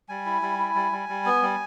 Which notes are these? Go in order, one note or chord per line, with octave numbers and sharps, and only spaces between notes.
G3 G#5
E4
G3
E4
G3
G3
G3
B3
G3